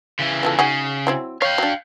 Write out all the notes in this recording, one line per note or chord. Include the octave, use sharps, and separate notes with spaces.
C#3 E3
B3 F4 A4
C#3 D#4 F#4 G#4
F#3 C4 E4
C#5 F5 G5
F#3 D4